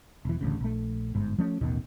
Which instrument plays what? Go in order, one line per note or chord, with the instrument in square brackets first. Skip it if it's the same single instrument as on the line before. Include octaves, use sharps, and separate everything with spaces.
[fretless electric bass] E1 E3
A1 D2 C#3
A#1 A3
G1 G#2
F3 A3 C#4
A1 D#2 B2 D#3